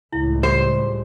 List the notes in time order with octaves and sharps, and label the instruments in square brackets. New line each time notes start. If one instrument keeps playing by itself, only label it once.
[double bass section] C#2 A2 [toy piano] E4
[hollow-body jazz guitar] G3 [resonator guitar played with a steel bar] C5